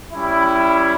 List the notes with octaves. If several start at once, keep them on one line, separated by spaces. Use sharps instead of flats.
G3 C#4 E4